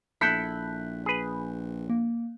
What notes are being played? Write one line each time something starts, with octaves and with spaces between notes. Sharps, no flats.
A#1 E4 A4 F#6 G6 B6
G#4 B4
A#3